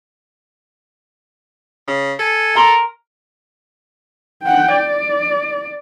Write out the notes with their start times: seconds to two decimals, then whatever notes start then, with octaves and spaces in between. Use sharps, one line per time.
1.88 C#3
2.19 A4 G#5
2.56 A#4 A#5 C6
4.43 F#5 G5
4.73 D5